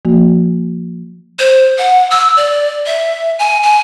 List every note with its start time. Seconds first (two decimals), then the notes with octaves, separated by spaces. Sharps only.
0.05 F3 A#3 F#4
1.39 C5
1.78 F#5
2.11 E6
2.37 D5
2.86 E5
3.39 G#5
3.63 G#5